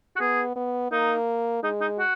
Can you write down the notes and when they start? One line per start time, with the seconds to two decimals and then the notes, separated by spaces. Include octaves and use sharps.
0.16 F#4
0.20 B3 G#4
0.55 B3
0.92 A#3 D#4
1.63 G#3 D#4
1.81 D#4
1.99 F#4